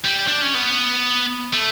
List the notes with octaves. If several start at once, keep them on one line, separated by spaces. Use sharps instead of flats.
G3
D4
C#4
B3
A3